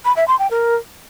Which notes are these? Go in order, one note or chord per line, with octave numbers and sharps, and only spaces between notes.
B5
E5
C6
G5
A#4